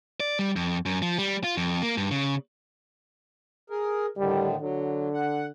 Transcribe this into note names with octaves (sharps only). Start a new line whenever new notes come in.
D5
G3
F2
F#2
F3
G3
F4
F2
A#3
G2
C#3
G#4 A#4
A2 D3 D#3 G3
D3 F#3
F#5